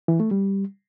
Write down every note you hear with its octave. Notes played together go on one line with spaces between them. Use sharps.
E3
A3
G3